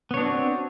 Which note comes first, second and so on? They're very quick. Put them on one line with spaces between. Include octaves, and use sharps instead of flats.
B3 C#5 D4 F#4 C4